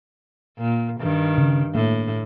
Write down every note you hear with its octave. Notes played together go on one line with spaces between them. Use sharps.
A#2
G2 D#3
C#3
A2 A#3